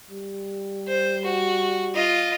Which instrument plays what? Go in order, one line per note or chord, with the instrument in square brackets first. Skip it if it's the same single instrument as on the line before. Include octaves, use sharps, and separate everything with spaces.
[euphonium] G3
[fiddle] C5
F#4
F4 D#5